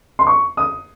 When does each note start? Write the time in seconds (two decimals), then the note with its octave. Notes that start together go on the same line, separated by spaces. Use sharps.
0.19 C6
0.27 C#6
0.57 D#6